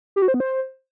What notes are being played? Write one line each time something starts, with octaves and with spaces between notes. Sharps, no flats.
G4
F#4
C5
B3
C5